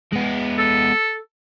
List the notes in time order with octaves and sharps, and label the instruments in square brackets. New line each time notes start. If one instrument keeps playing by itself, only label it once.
[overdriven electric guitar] G#3 B3
[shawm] A4